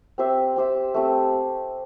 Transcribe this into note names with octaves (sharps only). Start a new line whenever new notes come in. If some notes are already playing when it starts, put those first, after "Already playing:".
C4 G4 C5 E5
C4 G4 C5 E5
A3 C4 G4